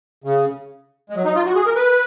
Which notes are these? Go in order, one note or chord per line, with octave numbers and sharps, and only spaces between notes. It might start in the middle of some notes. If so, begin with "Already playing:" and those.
C#3
G#3
F#3
D#4
F4
F#4
G#4
A#4
B4